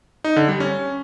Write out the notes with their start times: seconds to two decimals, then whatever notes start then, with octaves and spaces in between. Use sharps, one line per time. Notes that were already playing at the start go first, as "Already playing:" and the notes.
0.24 D#4
0.36 D3
0.48 G3
0.60 C#4